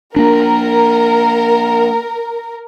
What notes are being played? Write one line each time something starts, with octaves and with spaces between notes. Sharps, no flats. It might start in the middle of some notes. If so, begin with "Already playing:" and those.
A#3 D4 A#4